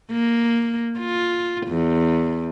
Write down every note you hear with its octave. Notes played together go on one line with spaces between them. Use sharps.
A#3
F4
E2